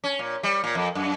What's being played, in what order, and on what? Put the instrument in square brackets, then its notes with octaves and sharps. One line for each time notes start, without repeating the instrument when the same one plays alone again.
[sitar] C#4
A#2
G3
A#2
F2
F#2